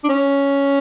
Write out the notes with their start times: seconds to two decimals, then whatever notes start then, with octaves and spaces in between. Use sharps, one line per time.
0.04 D4
0.09 C#4